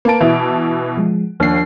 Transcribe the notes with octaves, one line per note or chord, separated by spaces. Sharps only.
A#3 B4 A5 D7
B2 E3 E4
F3 G#3
D#2 F3 D4 C7